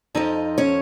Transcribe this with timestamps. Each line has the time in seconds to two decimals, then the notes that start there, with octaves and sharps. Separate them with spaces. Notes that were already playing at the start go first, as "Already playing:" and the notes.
0.15 F2 F3 D#4 D#5
0.58 C#4 C#5